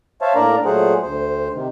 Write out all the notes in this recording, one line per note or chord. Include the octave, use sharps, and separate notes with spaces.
C5 C#5 E5 F5 A5
A2 A#3 D4 A#4 D5 A#5
A#2 F#3 A3 G#4 C5 F#5
D2 C5
C3 D#3